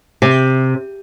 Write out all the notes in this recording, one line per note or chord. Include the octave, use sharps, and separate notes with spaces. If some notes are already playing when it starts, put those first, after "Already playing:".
C3